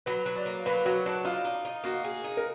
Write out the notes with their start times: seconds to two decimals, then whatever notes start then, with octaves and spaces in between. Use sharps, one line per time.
0.06 F#3 B4
0.26 F#3
0.36 D5
0.46 A#3
0.66 F#3 B4
0.85 F#3 F#4
1.06 D4 F#4
1.25 D#4 F4
1.44 D#4
1.65 D#4
1.84 A#3 F#4
2.04 G#4
2.24 D#4
2.37 A#4